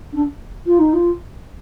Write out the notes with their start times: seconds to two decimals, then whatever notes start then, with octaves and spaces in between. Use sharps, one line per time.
0.13 D4
0.65 F4
0.78 D#4
0.93 F4